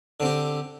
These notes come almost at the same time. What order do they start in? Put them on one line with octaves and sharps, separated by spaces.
D3 C4 G4